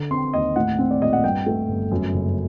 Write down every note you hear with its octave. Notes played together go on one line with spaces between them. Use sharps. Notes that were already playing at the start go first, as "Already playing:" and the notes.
Already playing: D3
C4 C6
D#2 D#5
A2 F#5
C4
D5
A#1 D#5
F#5
G2 G5
A3
G1
F#2
F#1